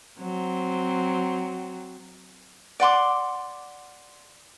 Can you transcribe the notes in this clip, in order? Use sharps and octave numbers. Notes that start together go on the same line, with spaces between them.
F#3 C4
D5 F#5 C6 D6